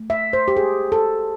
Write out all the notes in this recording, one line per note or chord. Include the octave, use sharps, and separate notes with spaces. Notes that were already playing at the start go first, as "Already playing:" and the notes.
Already playing: A3
E5
C5
G4
G#4
A4